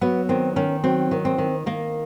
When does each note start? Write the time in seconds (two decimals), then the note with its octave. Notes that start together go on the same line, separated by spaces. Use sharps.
0.01 F#3 B3
0.29 D#3 C4
0.56 D#3 C#4
0.84 F#3 C4
1.11 D#3
1.25 C4
1.38 D#3
1.66 D#3 A#3